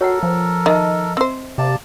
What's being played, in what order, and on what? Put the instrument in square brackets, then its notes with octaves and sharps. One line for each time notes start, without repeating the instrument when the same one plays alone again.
[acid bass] F#4 [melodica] A4 A#4 [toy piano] C#5 F#5
[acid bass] F3
[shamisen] D#3 [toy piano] D#5 E5 A5
[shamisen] C4 C5 [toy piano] E5
[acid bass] C3 [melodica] A#3 D5 A5